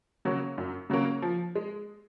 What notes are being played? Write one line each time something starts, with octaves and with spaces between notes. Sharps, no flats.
C#3 F#3 A#3 C#4
F#2
C#3 F#3 A#3 C#4
F3
G#3